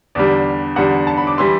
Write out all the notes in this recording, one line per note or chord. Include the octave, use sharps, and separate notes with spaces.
E2 D3 G3 D5
E2 D3 G3 F#5
A5
B5
D6
E3 G3 C6